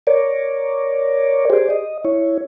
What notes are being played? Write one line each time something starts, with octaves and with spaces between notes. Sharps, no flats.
A#4 C#5 D5
G4 G#4 C5 D5
D#5
E4 C#5